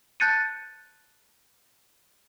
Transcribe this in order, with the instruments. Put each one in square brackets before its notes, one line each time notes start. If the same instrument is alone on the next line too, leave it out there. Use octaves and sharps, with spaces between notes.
[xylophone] A5 F#6 G6 A6 C#7 D#7